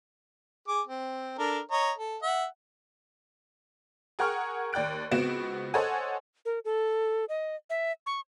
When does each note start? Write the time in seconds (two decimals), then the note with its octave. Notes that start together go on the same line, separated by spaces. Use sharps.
0.68 G#4 D6
0.87 C4
1.39 D4 A4 A#4
1.71 C#5 D#5 A#5
1.98 A4
2.23 E5 F#5
4.19 G#4 A#4 F#5 G5 C#6 F6
4.73 D#2 D5 G5 F#6 D7
5.11 C#2 B3 C4 F#4 D7 E7
5.74 A4 C5 C#5 D#5 F#5 G#5
6.45 A#4
6.65 A4
7.29 D#5
7.70 E5
8.06 C#6